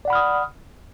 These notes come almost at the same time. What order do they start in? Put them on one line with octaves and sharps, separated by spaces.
D5 F#5 B5 F6 D#6